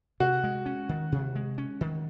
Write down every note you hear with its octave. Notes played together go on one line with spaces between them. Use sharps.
C3 F#4
G#3
C#4
D#3
C3
G#3
C#4
D#3